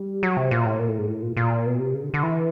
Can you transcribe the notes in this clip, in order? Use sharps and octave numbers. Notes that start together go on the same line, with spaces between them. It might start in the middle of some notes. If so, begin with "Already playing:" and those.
Already playing: G3
F#3
C3
A#2
A2
A#2
A2
G#2
A2
A#2
A#2
B2
C3
C#3
D3
D3
E3